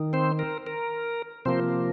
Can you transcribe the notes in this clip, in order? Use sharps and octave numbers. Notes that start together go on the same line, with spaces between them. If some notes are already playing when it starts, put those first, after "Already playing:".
Already playing: D#3
C4 C5
A#4
A#4
C3 F3 A#3 C4 C5